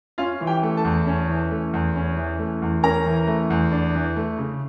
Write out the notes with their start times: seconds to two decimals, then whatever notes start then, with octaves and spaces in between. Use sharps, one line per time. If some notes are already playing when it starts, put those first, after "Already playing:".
0.18 C#4 F4 F5
0.41 E3
0.47 G4 G5
0.63 A3
0.77 A4 A5
0.85 E2
1.07 C#4
1.29 E3
1.51 A3
1.73 E2
1.96 C#4
2.17 E3
2.39 A3
2.62 E2
2.83 C#4 A#4 A#5
3.06 E3
3.27 A3
3.50 E2
3.72 D4
3.95 E3
4.16 A3
4.38 C#3